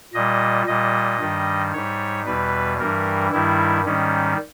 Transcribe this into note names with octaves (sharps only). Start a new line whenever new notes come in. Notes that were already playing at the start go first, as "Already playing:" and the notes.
A#2 G3 D#5
A#2 G3 D#5
G2 D#3 G3
G#2 G3 C#5
E2 B2 G3 B4
G2 E3 G3 A#4
G2 D#3 G3 E4
G#2 D#3 G3 C#4